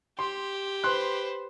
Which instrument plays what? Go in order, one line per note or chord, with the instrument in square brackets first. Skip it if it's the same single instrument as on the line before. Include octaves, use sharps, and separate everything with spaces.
[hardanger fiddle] G4 [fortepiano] C6
[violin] B4 C5 [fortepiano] C6 F#6